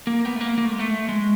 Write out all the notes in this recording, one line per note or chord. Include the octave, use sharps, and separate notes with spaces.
A#3
B3
A3
A#3
A#3
A3
G#3
A3
G#3